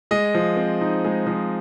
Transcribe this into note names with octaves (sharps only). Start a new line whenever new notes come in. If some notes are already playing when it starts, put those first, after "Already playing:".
G#3 D#5
F3
C4
D#4
G#3
F3